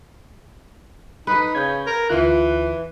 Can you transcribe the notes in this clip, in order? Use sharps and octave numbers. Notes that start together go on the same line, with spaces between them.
D#4 B4
C#3 G6 G#6
A#4
D2 E3 F4 F#6